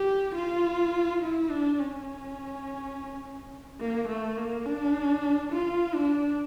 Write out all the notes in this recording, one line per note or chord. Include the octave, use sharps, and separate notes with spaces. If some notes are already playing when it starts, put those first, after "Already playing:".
Already playing: G4
F4
E4
D4
C#4
A#3
A3
A#3
D4
F4
D4